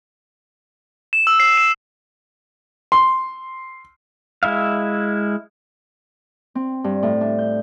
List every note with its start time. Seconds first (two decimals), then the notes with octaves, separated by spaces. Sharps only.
1.13 E7
1.27 E6
1.40 C7
1.58 E7
2.92 C6
4.43 G#3 E4 E5 F5
6.55 C4
6.84 G2
7.03 A2
7.21 D4
7.39 G6